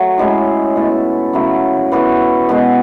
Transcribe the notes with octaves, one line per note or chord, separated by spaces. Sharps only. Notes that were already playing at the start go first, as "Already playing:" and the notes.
Already playing: F#3 A3
A2 G#3 C#4 E4
B2 A3 E4 A4
C#3 F#3 A3 E4
E3 B3 F#4 A4
B2 G#3 B3